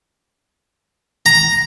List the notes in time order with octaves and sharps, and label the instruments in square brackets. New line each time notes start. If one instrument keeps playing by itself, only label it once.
[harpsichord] A#5